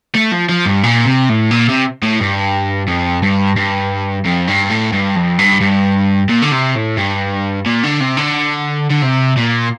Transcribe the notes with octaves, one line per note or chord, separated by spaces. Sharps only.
A3
F3
F3
G2
A#2
C3
A2
A#2
C3
A2
G2
F2
G2
G2
F2
G2
A2
G2
F2
G2
G2
A#2
D3
C3
A2
G2
A#2
D3
C3
D3
D3
C3
A#2